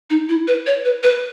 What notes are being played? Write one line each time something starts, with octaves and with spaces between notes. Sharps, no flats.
D#4
E4
B4
C#5
B4
B4